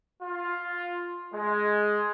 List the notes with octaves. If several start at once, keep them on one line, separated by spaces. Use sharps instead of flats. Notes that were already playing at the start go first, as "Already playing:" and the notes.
F4
G#3